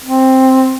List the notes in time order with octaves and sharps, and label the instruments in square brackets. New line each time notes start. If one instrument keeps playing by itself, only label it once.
[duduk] C4